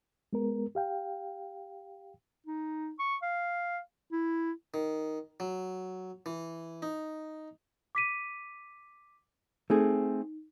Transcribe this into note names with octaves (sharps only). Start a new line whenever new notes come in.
G#3 B3 A#4
G4 F5 G5
D#4
C#6
F5
E4
D#3
F#3
E3
D#4
D6 B6 D#7
A3 C4 D#4 G#4